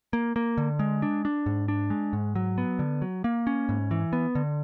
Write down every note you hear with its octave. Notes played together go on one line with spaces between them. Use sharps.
A#3
A#3
D3
G#3
D4
D4
G#2
D4
G#3
G#2
F#3
B3
D3
F#3
A#3
C#4
G#2
E3
B3
D3